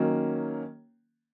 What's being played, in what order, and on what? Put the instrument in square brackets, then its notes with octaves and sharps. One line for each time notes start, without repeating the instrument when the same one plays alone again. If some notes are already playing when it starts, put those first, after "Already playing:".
Already playing: [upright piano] D#3 F#3 A#3 C#4